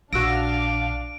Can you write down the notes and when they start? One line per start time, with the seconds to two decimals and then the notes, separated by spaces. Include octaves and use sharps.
0.13 A#1 D4 F#4 F5 E6 A#6 D7